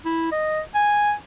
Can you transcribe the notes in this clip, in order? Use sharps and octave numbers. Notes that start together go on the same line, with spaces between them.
E4
D#5
G#5